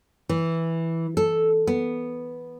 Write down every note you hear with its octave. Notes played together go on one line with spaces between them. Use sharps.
E3
A4
B3